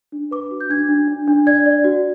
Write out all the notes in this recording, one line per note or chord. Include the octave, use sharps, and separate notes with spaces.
D4
B4 D6
F#4
G6
D4 G#6
D4
D4
D4
D5 G#6
D5
F#4